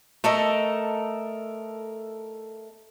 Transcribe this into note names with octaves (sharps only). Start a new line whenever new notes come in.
A3 A4 A#4 D#5